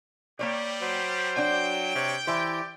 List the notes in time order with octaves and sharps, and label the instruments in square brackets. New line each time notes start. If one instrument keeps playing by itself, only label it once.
[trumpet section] G3 G4 [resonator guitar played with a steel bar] A#3 C#5 D5
[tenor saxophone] F#3 [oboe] C5
[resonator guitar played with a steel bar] D4 F#4 D5 [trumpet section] G5
[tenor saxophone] C3 [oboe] C#5
[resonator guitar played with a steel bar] E3 E4 C5 [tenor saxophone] G4 [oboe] D5